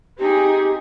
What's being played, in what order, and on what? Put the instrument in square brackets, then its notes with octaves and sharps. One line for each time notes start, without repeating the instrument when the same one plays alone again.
[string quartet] C4 D#4 G#4 [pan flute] G4